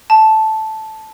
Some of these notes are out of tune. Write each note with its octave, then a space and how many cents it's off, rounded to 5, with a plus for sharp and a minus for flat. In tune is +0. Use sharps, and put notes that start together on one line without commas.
A5 -5